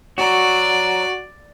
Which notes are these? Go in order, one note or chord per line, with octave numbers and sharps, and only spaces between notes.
F#4 C#5 D5 A#5